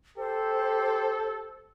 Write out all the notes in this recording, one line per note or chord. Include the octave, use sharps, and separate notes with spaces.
G4 A4 C5